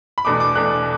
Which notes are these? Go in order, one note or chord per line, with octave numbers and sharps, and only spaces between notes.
B5
E2 B2 A3 D4 D6
D6
E2 B2 A3 D4 F#6